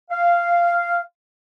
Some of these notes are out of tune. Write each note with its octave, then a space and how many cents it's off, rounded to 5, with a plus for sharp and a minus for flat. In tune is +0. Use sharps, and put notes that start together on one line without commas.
F5 -10